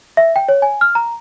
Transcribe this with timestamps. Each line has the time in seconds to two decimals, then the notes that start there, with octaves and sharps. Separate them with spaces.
0.17 E5
0.36 G5
0.49 C#5
0.62 G#5
0.81 F6
0.95 A#5